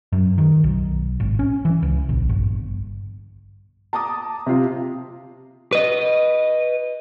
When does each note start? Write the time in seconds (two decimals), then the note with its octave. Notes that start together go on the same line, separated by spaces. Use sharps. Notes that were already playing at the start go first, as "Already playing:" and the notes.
0.13 F#2
0.38 D#3
0.64 B1
1.20 G#1
1.39 C#4
1.65 E3
1.83 C#2
2.09 A#1
2.29 G1
3.93 A5 A#5 D6 D#6
4.46 C3 F4
5.72 B4 D#5